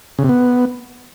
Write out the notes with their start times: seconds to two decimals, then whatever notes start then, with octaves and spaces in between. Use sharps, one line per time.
0.19 C#3
0.24 C3
0.29 B3